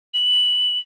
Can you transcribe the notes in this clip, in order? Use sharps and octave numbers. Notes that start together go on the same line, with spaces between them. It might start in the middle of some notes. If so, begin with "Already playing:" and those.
F#7